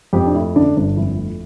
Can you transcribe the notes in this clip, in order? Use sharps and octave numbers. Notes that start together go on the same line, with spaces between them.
F2 G4
D4
A3 E4
D3 D4
G1 D4
F2 E4
A3